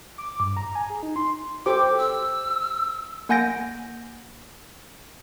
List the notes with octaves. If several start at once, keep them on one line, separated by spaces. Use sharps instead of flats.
D6
G2
A#5
G#5
G#4
D#4
C6
G4 A4 C5 D6
E6
A#3 F#5 G#5 G6 A#6 D7